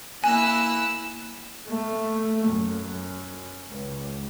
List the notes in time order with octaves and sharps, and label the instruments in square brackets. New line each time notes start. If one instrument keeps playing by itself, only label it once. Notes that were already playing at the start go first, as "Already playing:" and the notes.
[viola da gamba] A#3 E4 [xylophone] G#5 [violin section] E6 F#6
[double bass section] A3
F#2
C#2